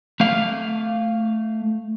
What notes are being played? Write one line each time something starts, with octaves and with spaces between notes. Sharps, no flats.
A3 F5